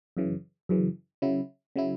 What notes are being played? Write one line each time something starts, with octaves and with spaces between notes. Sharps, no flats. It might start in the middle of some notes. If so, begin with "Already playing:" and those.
F#2 C#3 E3
F#2 C#3 E3
C#3 F#3 E4
C#3 F#3 E4